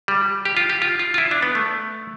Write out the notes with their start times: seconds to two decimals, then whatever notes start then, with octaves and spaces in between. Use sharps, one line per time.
0.08 G3
0.45 G4
0.57 F4
0.69 G4
0.82 F4
0.99 F4
1.14 F4
1.18 E4
1.31 D4
1.42 B3
1.55 A3